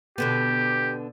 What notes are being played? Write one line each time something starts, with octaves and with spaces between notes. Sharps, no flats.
B2 D3 B3 G4